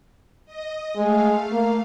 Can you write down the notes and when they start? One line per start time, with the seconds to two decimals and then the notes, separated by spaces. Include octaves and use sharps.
0.45 D#5
0.97 G#3 A3 F5
1.52 A#3